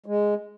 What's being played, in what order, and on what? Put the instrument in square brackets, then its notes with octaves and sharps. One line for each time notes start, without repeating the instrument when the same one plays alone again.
[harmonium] G#3